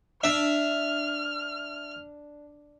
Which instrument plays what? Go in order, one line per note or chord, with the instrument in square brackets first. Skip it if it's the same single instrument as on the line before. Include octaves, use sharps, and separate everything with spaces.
[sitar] D4 [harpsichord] E5 [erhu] F6